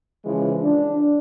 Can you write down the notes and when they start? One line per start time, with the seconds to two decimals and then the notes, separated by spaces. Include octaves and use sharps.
0.24 C#3 E3 F3 G#3
0.62 D4